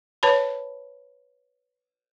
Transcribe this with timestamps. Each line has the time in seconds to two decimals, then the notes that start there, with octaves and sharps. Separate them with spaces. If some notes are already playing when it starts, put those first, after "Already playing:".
0.23 B4 C#5 A5 B5